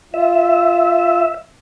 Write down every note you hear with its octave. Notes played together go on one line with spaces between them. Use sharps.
F4 E5